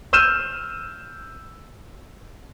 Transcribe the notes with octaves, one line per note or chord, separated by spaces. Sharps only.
E6 F6 G6 D#7 E7